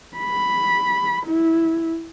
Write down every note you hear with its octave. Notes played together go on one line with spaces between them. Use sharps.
B5
E4